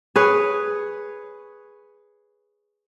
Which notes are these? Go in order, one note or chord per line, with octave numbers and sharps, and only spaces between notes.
G#4 B4 C#5